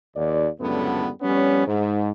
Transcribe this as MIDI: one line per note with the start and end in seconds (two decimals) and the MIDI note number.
0.16 0.48 39
0.16 0.48 74
0.60 1.09 37
0.60 1.09 42
0.60 1.09 45
0.60 1.09 50
0.60 1.09 55
0.60 1.09 59
1.22 1.64 41
1.22 1.64 55
1.22 1.64 59
1.22 1.64 61
1.67 2.11 44